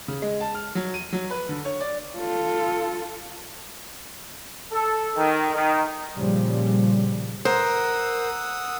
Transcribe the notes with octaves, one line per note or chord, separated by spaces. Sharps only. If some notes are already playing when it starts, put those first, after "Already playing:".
C#3
G#3
A5
F6
F#3
D#7
F#3
B4
D3
C#5
D5
F4 A4
A4
D#3
D#3
A#2 C#3 F3 G3
A#4 C5 F#5 D#6 E6